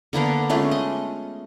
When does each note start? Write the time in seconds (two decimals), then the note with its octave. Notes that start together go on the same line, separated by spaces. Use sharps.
0.13 D3 A#3 B3 D4
0.50 G#3 A3 C#4 F4
0.71 D#5